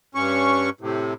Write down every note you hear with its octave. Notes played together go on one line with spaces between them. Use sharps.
G2 C#4 C#6
A2 C3